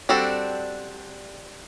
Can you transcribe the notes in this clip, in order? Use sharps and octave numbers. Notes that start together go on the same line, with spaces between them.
G3 C4 D4 F#4 A4